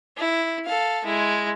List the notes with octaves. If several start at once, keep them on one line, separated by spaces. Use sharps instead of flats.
E4
A4 F5
G#3 E4